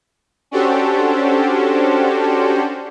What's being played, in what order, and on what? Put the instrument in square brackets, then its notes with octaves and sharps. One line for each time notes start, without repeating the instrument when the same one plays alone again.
[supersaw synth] C#4 D4 F#4 G4 A4 C5